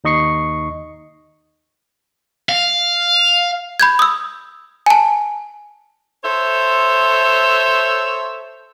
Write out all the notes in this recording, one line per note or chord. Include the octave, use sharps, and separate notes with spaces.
D#2 D#4 D#5 C#6 C7 C#7
F5
B5 G6 G#6
D#6 E6
G#5 A5
A4 C5 C#5 E5